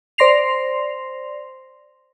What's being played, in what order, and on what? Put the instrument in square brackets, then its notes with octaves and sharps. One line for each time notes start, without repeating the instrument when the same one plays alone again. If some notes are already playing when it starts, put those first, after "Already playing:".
[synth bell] C5 D5 C6 A#6 C7 F7